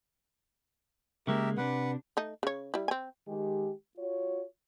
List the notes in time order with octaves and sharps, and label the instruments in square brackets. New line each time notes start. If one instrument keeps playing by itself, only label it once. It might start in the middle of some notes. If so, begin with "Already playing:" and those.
[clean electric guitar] C#3 G#3 A#3 [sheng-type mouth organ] G4 A#4 E5
[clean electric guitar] C3 D4 [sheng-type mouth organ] B4 F#5
[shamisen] A3 D#4
C#3 C#5
G3 E4
C4 G#5
[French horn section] D#3 G#3 G4
F4 F#4 C#5